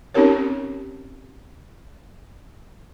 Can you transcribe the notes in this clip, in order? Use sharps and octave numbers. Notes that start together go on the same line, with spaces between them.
C4 C#4 D#4 G4 A#4 C#5